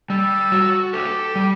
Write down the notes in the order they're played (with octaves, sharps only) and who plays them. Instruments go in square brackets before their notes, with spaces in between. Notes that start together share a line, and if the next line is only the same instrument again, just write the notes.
[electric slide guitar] G3 [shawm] A4
[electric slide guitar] F#4
[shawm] G4 [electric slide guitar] A4
[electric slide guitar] G3